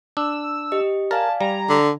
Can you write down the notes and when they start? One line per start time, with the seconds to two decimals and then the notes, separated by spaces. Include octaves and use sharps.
0.17 D4 E6
0.72 G4 D#5
1.11 A#4 D5 F5 G#5 A5
1.41 G3 D5 A#5
1.69 D3